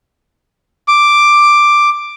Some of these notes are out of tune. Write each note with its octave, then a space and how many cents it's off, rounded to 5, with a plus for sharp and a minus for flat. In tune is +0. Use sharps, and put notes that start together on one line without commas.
D6 +5